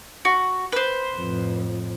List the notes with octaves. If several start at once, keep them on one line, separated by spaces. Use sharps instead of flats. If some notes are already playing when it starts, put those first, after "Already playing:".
F#4
B4 C5
F2 A2